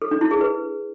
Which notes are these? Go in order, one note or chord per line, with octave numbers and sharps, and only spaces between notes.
A4
D4
E4
G#4
B4